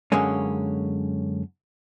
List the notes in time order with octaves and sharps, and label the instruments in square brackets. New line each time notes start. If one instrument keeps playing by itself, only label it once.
[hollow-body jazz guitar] F#2 D3 G#3 A#3 C#4